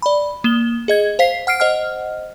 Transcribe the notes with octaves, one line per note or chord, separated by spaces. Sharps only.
D5 B5
A#3 E7 G7
G#4 D#5 G#6
C5 F5 B6 C7
F#5 F6 C7 D7
C5 D#5 F#5 F6